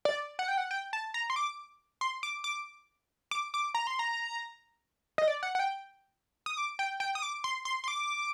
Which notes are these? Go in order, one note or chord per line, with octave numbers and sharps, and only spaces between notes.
D5
F#5
G5
F#5
G5
A5
A#5
C6
D6
C6
D6
D6
D6
D6
A#5
C6
A#5
D#5
D5
F#5
F#5
G5
D#6
D6
G5
G5
D#6
D6
C6
C6
C6
D6